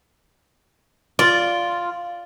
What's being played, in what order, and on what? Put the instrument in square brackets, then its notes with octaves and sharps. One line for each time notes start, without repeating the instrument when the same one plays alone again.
[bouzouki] F4 [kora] D5